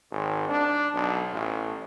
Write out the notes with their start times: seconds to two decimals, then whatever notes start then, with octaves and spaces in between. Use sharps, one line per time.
0.11 G#1
0.49 D4
0.94 B1
1.33 A1